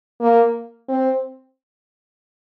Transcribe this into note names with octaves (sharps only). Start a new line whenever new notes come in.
A#3
C4